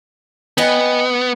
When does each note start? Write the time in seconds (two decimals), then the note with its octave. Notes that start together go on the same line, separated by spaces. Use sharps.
0.58 B3 D#5 G5 G#5